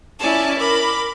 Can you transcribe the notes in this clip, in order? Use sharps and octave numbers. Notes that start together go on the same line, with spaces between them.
C#4 E4 D5 G#5 A5
A#4 B5 D6